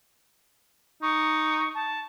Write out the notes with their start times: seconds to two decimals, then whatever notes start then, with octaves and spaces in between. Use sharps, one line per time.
1.02 D#4 C#6
1.75 A5